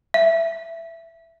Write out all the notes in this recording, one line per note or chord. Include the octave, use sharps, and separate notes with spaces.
E5